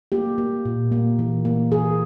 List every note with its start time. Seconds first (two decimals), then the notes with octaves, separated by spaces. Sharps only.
0.12 A#3 G4
0.38 A#3
0.65 A#2
0.92 A#3
1.19 E3
1.45 A#3
1.71 E3 G#4